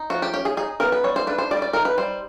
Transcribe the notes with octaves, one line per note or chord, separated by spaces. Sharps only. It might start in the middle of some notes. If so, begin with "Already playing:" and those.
Already playing: D#4
F3 F#4
G4
C#4 G4
G#4
D#4 G#4
B3 A#4
B4
G3 C#5
C5
D4 B4
C5
G3 D5
D#5
D5
D#4 A#4
B4
G3 C5